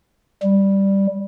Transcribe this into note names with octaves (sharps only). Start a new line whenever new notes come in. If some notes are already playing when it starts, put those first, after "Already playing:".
G3